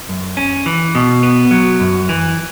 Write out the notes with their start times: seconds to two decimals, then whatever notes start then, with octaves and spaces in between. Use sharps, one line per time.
0.09 F#2
0.37 C#4
0.66 E3
0.95 B2
1.23 B3
1.51 F#3
1.80 F#2
2.09 E3